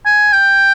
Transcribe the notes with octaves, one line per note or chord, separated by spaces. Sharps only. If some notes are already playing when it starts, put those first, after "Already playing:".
G#5
G5